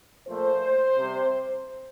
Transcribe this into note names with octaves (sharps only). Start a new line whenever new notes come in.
A#2 F3 A3 C5
C3 G3